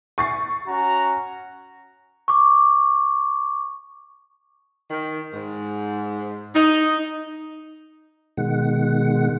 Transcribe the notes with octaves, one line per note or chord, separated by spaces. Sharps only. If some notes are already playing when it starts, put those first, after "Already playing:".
C#6 A6 C7
C#4 F#4 A#5
C#6 D6
D#3
G#2
D#4
B2 D#3 G#3 F#5